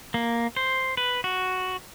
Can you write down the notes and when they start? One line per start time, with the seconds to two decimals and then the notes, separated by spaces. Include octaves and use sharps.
0.14 A#3
0.56 C5
0.97 B4
1.24 F#4